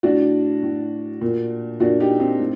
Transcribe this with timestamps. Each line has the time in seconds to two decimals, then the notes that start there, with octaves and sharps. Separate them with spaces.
0.03 A2 D4 F#4
0.63 A2
1.22 A#2
1.80 A#2 D4 F#4
2.00 D#4 G4
2.20 C4 D#4
2.40 A2